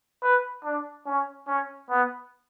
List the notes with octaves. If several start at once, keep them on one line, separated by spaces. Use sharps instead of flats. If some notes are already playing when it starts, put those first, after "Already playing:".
B4
D4
C#4
C#4
B3